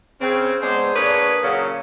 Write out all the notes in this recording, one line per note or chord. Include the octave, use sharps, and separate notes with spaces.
C#3 C4 C#4
G#3 B3 D4 G#4 C5
A#3 D4 G#4 B4 C#5
A#2 C#3 F#3